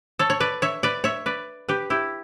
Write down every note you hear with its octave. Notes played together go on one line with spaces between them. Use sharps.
A4 C#5
C#5
B4 D5
C#5 E5
B4 D5
C#5 E5
B4 D5
G4 B4
E4 G4